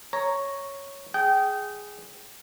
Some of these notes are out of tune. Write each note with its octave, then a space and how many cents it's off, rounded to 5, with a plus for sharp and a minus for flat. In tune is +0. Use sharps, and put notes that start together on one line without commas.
C#5 +0 A#5 +0
G#4 +0 G5 -25